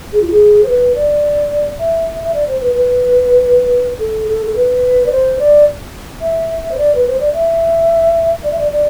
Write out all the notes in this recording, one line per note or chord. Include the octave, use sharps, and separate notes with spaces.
G#4
F4
G#4
C5
B4
D5
E5
E5
D5
C5
B4
B4
A4
A4
A4
B4
D5
C5
D5
E5
C5
D5
B4
C5
D5
E5
D5
E5
D5
D5